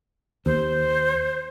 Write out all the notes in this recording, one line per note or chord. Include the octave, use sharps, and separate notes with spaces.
D#2 C5